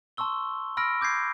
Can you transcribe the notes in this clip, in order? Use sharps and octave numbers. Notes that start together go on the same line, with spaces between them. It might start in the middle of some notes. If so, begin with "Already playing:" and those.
A5 C6 C#6 E6 G7
B5 E6 F6 A#6 D7
D6 G6 G#6 C7